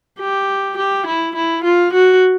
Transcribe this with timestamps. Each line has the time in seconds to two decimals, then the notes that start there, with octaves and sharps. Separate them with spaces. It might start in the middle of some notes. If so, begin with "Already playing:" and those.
0.20 G4
0.78 G4
1.06 E4
1.35 E4
1.64 F4
1.93 F#4